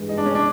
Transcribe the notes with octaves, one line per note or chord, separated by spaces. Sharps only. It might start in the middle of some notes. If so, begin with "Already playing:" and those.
Already playing: G2 E3 G#3
D#4
D4
C#4
D4